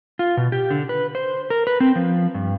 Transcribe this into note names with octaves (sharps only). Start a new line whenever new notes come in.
F4
B2
G4
D3
B4
C5
A#4
B4
C4
F3
G2